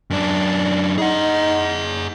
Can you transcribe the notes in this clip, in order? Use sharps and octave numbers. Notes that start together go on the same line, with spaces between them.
F#2 D4
D#4 G#4 F#5